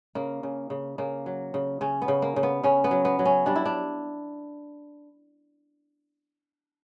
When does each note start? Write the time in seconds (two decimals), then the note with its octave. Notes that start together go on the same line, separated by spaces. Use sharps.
0.15 C#3 A#3
0.43 C#3
0.70 C#3
0.98 C#3 A#3
1.26 F#3
1.54 C#3
1.81 C#3 C#4
2.02 B3
2.08 C#3
2.22 A#3
2.36 C#3
2.43 B3
2.64 C#3 C#4
2.84 B3
2.91 F#3
3.05 B3
3.19 F#3
3.25 C#4
3.46 G3 D4
3.56 E4
3.65 D4